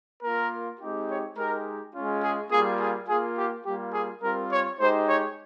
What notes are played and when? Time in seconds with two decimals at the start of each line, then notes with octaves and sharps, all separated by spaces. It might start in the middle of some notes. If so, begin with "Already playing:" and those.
0.23 A#3 F4 A#4
0.80 G#3 C4 D#4 G4
1.09 C#5
1.37 G#3 D#4 G4 A#4
1.94 G#3 C#4 F4
2.23 G#4
2.51 G3 A#3 F4 G#4
2.80 G#4
3.08 A#3 F4 G#4
3.37 G4
3.66 G3 A#3 F4 G4
3.94 G#4
4.22 G3 C4 F4 A#4
4.51 C#5
4.80 G#3 D#4 G4 C5
5.08 C#5